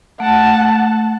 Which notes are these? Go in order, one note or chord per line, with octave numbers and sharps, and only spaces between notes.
A3 F#5 A5